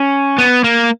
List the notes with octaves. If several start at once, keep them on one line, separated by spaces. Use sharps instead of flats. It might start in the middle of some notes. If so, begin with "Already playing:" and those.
Already playing: C#4
B3
A#3